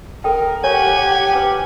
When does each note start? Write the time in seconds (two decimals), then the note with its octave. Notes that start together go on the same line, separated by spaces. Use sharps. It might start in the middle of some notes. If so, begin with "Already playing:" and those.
0.24 A4 A#4 G5
0.64 G4 C#5 F#5 G#5 C#6
1.33 B4 D6